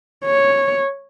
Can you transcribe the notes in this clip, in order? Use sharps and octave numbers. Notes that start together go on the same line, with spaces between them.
C#5